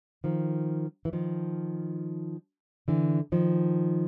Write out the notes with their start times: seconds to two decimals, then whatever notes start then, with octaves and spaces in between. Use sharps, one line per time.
0.24 D#3 F3
1.05 E3
1.13 D#3 F3
2.88 D3 E3
3.32 D#3 F3